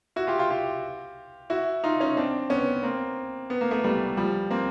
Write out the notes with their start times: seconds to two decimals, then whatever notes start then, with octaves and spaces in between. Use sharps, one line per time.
0.16 E4 F#4
0.27 F4 G4
0.39 F4 G4
0.50 F4 G4
1.50 E4 F#4
1.84 D#4 F4
2.00 C#4 D#4
2.17 C4 D4
2.50 B3 C#4
2.83 A#3 C4
3.50 B3
3.61 A#3
3.71 A3 B3
3.84 G3 A3
4.17 F3 G3
4.51 A#3 C4